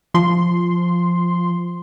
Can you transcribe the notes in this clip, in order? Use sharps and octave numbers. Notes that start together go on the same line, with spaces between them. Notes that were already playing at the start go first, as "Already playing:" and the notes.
F3 C6